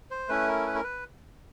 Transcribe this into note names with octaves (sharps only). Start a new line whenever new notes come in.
C5
A3 C#4 E4 B4
A#4
B4
A#4
B4